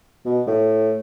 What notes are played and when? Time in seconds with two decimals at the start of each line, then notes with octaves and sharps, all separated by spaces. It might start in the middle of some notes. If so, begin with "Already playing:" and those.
0.25 B2
0.47 A2